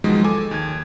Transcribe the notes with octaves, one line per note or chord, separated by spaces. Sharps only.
G#2 B2 D#3 F3 F#3 G#3
A4 G#5 D6
D#2 G#6